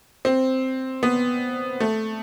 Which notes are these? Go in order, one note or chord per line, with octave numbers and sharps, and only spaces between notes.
C4
B3
A3